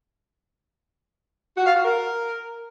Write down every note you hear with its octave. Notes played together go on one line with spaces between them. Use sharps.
F#4
F5
F#4
A#4